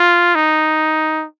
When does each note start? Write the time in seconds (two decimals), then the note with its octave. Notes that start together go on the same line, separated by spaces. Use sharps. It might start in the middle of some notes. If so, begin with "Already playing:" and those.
Already playing: F4
0.35 D#4